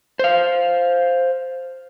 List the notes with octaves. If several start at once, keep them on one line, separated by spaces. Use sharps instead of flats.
C5 F5